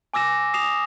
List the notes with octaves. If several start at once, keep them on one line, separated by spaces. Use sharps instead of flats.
G#5 D6 E6 A#6 E7
D#6 C7 E7 F7